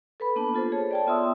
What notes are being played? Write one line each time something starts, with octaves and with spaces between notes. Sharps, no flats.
A4 B4 B5
A#3 B3 D4 A5
F4 A4 C5
G#4 C#5 A5
D5 G5 A5
B3 F4 E5 C6 D#6 E6